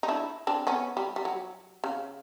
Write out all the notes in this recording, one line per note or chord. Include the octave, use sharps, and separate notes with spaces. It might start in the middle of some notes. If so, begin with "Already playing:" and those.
D#4
D4 E4
C4 D4
B3 C#4
G3
G3
F#3
C#3